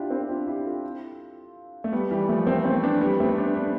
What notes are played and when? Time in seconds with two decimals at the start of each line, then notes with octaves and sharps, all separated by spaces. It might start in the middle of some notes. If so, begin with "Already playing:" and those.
Already playing: D4 E4 F4 G4
0.10 C4 E4
0.29 D4 F4
0.47 E4 G4
0.65 F4 A4
1.84 A3
1.92 G3 B3
2.10 E3 G3
2.29 F3 A3
2.47 A3 C4
2.65 A3 C4
2.83 B3 D4
3.01 G3 B3
3.20 A3 C4
3.38 B3 D4
3.56 B3 D4